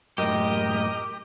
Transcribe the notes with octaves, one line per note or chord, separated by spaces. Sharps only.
F#2 A2 G4 A#4 D#5